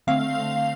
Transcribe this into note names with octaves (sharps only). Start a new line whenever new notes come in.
D3 A3 C4 F5